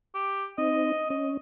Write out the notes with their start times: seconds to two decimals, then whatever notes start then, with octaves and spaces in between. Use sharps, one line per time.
0.15 G4
0.58 C4 D#4 D#5
1.10 C#4 D#5